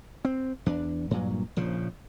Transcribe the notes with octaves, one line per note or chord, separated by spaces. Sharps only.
C4
E2 D4
G2 A#2 F#3
A#1 C#3 F3